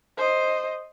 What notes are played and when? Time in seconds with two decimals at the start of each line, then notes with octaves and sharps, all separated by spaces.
0.17 C5 D#5